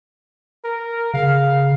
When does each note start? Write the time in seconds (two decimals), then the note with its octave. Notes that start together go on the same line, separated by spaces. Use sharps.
0.64 A#4
1.14 C#3 F5